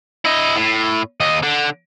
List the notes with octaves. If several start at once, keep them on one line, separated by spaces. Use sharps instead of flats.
E4 D#5
A2
D#2 D#5
D3